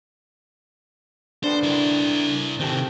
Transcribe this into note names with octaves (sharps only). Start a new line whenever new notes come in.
D4 A4 B4 C5
E4 A#4
C3 D#3 C4 G4 A4